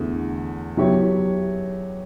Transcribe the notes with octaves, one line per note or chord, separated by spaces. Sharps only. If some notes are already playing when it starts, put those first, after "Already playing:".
Already playing: E2 D3 A3
F#3 B3 E4 G4 C#5